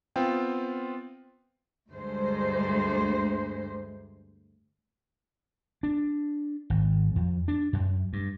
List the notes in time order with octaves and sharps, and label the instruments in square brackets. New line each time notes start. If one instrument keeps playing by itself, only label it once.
[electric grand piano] B3 C4 F4 G5
[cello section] D2 G2 G#3 C5
[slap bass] D4
G#1
F2
D4
F#2
G2